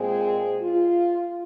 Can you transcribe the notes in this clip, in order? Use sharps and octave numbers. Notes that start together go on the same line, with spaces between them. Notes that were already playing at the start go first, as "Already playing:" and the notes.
Already playing: A#2 G#3 C4 G#4
F4